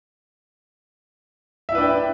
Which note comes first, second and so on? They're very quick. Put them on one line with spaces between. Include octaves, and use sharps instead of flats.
E5 E4 B4 D4 G5